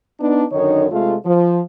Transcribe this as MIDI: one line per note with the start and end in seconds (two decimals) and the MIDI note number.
0.20 0.44 59
0.20 0.44 62
0.20 0.44 63
0.51 0.86 42
0.51 0.86 50
0.51 0.86 51
0.51 0.86 63
0.51 0.86 73
0.90 1.15 48
0.90 1.15 56
0.90 1.15 57
0.90 1.15 65
1.25 1.60 53